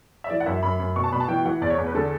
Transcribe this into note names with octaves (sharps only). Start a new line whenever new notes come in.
E5
E3 D5
F#5
F#2 E5
F#2 B5
F#2
B2 C#6
A5
B2 B5
A5
E3 G5
E3 F#5
E2 D5
C#5
E2
B4
D3 A4